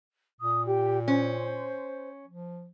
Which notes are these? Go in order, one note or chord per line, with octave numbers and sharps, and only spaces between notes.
A#2 D#6
G4
C#4 C5
F3